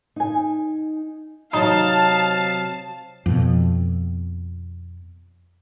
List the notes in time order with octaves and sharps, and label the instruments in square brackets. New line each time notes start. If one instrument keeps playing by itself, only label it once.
[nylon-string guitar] D#4 G#5
[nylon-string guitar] C3 F#3 C4 [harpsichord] D#4 [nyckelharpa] F5 [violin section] A5
[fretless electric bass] F2 B2